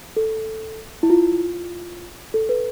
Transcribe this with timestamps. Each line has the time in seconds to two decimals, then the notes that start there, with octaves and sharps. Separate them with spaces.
0.16 A4
1.03 E4
1.10 F4
2.34 A4
2.49 B4